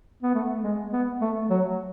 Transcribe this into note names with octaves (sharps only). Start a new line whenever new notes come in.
B3
A3
G#3
B3
A3
F#3